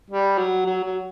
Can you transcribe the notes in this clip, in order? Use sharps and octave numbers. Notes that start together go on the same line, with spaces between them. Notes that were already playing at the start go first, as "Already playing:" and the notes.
G3
F#3
F#3
F#3